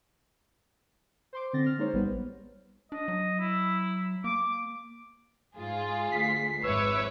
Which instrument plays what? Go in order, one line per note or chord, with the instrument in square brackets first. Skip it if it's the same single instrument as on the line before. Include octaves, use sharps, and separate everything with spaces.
[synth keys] C5 C6 D6
D3 C4 A6 A#6
F6
G#3 A#3 D#4 C5 C#5
A1 G3 B3 B4
[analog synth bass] D4 [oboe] D#5
[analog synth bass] F#3
[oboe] E4
[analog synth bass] A#3 [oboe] D6
[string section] G#2 [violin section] F4 G#4
[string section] D2 C7 [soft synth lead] B6
[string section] G#1 F2 D6 [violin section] B4 C#5 E5 [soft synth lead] E6